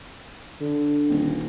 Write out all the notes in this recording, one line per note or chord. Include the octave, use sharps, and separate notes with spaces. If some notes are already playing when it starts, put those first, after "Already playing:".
D3
D#1